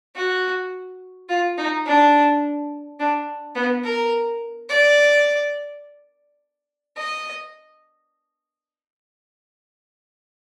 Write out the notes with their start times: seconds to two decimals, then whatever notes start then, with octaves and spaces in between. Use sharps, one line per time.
0.16 F#4
1.29 F4
1.58 D#4
1.86 D4
3.00 D4
3.55 B3
3.84 A#4
4.69 D5
6.97 D#5